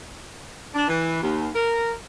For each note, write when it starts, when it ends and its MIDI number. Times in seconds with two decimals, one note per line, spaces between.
0.74 0.87 62
0.88 1.22 52
1.22 1.48 39
1.55 1.92 70